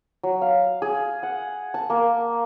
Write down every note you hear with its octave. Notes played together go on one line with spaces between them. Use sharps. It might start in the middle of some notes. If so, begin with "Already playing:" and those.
F#3
F5
G#4
F#5
A5
A#3